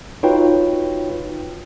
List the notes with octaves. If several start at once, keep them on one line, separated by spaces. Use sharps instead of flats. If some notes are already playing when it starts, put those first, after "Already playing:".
D#4 F4 F#4 B4 C#5 G5